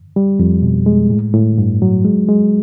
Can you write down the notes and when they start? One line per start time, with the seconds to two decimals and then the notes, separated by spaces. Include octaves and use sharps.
0.16 G3
0.39 F2
0.62 B2
0.86 G#3
1.10 A2
1.34 A2
1.58 G2
1.82 F#3
2.05 G#3
2.29 G#3